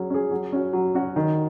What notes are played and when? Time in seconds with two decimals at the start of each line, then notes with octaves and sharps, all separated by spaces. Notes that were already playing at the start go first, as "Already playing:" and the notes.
Already playing: F#3 C#4 G#4
0.10 C#4 G#4
0.31 F#3
0.52 C#4 F#4
0.73 F#3
0.95 C#4 F#4
1.16 D#3